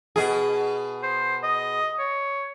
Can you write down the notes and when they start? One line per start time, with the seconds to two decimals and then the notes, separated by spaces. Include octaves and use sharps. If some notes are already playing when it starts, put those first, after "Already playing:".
0.16 B2 G#4
1.03 C5
1.43 D#5
1.99 C#5